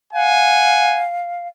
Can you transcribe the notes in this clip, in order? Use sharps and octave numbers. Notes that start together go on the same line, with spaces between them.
F5 F#5 G#5